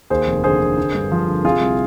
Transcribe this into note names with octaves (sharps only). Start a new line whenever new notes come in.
D#2 G#4 C5
F1
D3 G#4 C5
D3
D3
G2
F3
D3
C3 F4 G#4
C2